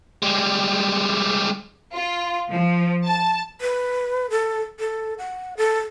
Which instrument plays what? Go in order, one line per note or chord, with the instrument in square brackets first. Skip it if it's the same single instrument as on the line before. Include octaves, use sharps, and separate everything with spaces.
[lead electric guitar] G3 G#3
[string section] F4
F3
A5
[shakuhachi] B4
A4
A4
F#5
A4